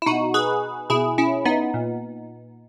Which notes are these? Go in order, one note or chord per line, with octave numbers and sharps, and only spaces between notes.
E4
B2 D#4 F#4
G#4 B4
B2 E4 G#4
C#4 E4
B3 D#4
A#2